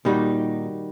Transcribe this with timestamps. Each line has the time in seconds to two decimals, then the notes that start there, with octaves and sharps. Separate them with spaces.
0.05 A#2 D#3 G3 D#4 F#4